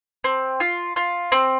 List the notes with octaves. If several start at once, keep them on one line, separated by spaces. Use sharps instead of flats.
C4
F4
F4
C4